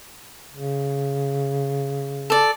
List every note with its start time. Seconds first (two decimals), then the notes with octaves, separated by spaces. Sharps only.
0.53 C#3
2.30 A4 D5